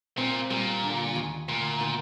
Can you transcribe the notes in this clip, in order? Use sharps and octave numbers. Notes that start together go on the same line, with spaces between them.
A#2 C4
A#2 G3
D3
D#2
D2 A#2
D#3